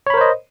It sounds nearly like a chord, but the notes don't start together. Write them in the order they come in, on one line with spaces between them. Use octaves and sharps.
C#5 B5 A#4 C5 D#5